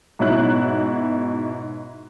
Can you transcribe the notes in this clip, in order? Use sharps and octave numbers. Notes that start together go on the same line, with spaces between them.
G#2 B2 C#4 E4 F#6